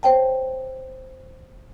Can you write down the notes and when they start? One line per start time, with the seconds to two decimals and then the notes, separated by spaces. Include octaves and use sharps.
0.03 C5 C#5 G5 A5